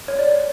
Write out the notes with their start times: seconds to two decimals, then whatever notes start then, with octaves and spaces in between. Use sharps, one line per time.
0.08 C#5
0.19 D5
0.31 C#5